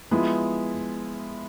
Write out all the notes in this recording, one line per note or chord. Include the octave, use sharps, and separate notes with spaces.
F3 G#3 B3 E4